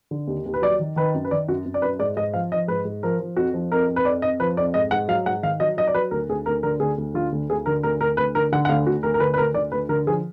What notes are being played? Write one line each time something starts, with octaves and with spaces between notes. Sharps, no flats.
D3
D#2
D#2
B4
F#3 D5
D#3
D#3 B4
F#2
B4
D#3 D5
F#2 F#4
F#2
D5
F#2 B4
G#2 D5
G#2 D#5
F3 F5
F3 D#5
G#2 B4
G#2
F3 A#4
F3
F2 F#4
F3
F2 A#4
F2
B4
F2 D5
F2 D#5
F3 B4
F2 D5
G#2 D#5
G#2 F#5
F#3 F5
G#2 F#5
D#3 F5
F#3 D#5
F#3 D#5
D5
F#3 B4
D2 A#4
D2 G#4
D2 A#4
D3 A#4
D2 G#4
D2
D3 F4
D2
D2 G#4
D3 A#4
D2 A#4
D2 A#4
D2 B4
D3 A#4
D3 F#5
F#5
D2 F5
D2 F#4
D2 A#4
A#4
D3 B4
B4
D2 A#4
D3 D5
D2 B4
D3 A#4
F3 G#4